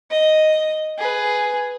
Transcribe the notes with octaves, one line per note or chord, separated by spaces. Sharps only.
D#5
G#4 B4